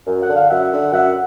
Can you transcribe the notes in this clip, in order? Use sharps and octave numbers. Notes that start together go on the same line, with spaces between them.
F#2
F#5
D3
F5
F#2 E5 F#5
D3
F#2 E5 F#5